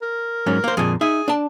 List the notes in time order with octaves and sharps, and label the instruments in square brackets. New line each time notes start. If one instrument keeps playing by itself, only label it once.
[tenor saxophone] A#4
[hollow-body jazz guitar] G#2 F#3 C#4
A#3 C5
[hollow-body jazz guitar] F2 A#2 [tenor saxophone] G#4
[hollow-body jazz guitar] D#4 E5 [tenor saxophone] G#4
[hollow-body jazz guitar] D4 A5